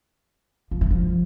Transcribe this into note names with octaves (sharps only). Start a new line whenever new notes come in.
F3
E3
F3